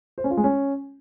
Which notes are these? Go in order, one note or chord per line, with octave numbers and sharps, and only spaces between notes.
C5
C#4
F4
G#3
C#4